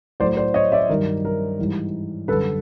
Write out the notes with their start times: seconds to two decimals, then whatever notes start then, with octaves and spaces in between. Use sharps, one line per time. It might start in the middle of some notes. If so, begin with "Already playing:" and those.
0.20 A2 F#3 C5 D5
0.37 C5 D5
0.54 C#5 D#5
0.72 D5 E5
0.89 G2 D#3 F#3 A#4
1.25 A#4
1.59 G#2 E3 G3
2.28 F#2 D3 G3 A4 B4